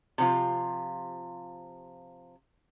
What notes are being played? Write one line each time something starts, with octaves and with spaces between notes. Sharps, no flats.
C3 F3 F4